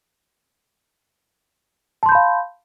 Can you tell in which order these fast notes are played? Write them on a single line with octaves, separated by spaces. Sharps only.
A5 C6 G6 B5 F5